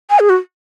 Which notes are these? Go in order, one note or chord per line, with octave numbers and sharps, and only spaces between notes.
G#5
G#4
F#4